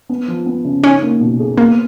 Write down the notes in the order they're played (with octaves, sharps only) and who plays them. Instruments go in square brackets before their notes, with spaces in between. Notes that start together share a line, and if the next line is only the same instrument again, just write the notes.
[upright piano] B3
F3
B3
C#3
[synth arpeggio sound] C#4 [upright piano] D#4
[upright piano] A#3
B2
G#4
[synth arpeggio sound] A#3 [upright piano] B3